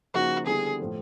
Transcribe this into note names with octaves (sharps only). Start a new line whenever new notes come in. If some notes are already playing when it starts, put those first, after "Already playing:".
C#3 F3 A#3 D#4 F#4
D3 G3 B3 E4 G#4
A2 F3 A3